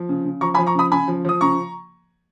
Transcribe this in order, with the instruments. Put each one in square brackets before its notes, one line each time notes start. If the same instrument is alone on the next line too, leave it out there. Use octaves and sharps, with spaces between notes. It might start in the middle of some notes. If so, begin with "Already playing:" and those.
Already playing: [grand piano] F3
C#3
C#3
F3 A#5 C#6
G#5 B5
F3
A#5 C#6
C#3 B5 D#6
C#3 G#5 B5
F3
F3 D#6
C#3 A#5 C#6